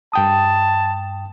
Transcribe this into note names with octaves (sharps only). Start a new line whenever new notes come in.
G2 G5 A5 D#6